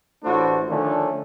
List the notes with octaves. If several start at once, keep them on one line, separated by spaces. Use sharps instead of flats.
A1 A3 D4 E4 F#4 C5
D3 D#3 F3 A3 C#4 D4